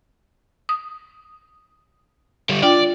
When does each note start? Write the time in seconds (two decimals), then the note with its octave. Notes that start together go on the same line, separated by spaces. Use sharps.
0.69 D#6
2.49 D3 G3
2.62 D4 F4 D5 G5